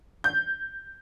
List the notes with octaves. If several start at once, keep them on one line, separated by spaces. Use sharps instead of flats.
G6